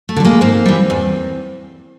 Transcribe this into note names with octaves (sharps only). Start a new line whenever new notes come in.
A3
D3
G3
G#3 A#3
G#2 A#3 C4
E3 G3
E2